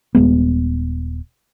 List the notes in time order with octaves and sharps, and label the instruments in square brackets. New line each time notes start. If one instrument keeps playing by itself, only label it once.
[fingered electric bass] D#1 F2 G#3 B3